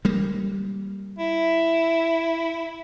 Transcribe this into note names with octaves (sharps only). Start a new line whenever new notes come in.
G3 A#3
E4